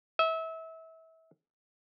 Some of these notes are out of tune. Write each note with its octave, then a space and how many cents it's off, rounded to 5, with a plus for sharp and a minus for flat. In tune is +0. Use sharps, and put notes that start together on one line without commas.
E5 -30